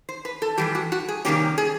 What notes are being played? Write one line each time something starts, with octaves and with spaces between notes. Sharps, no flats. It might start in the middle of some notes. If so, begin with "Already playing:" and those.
C5
B4
A4
A2 E3 G3 G4
F#4
F#4
G#4
C3 D#3 G3 A#3 C#4 G4
G#4